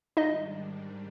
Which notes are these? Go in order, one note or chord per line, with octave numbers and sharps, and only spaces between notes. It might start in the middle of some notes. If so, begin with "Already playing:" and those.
G#2 D#3 G3 D4 D#4 D#5